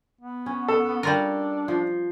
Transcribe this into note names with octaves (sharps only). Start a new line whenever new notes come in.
B3
C#4
A4
G3 D4 F4 A#4
F3